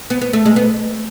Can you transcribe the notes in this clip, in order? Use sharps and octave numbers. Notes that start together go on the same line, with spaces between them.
B3
B3
A3
G#3
B3